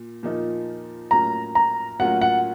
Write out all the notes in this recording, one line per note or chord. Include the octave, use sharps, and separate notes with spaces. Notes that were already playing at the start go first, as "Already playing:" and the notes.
Already playing: A#2
A#2 F3 A#3 D#4
A2 F#3 A#3 C#4 F4 A#5
A#5
A2 F#3 A#3 C#4 F4 F#5
F#5